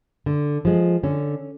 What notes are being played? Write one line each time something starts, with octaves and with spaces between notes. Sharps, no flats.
D3
F3 G#3
D3 C#4